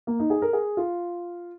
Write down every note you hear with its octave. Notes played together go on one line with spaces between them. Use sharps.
A#3
D#4
G#4
A#4
G#4
F4